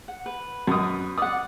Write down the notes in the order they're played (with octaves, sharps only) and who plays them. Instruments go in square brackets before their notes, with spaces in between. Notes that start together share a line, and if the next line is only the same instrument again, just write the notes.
[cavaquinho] F#5
B4
[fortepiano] F#2 D#6
[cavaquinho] D5 F#5 [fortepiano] D#6